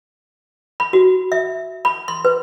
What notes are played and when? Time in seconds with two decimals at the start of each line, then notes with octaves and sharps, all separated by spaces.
0.80 B5
0.93 F#4
1.32 E5
1.85 B5
2.08 C6
2.25 B4